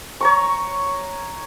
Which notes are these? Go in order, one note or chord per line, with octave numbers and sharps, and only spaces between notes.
C#5 A#5 C#6